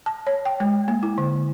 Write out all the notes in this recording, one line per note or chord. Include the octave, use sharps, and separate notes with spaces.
A5
C#5
G5
G#3
A#3
E4
D3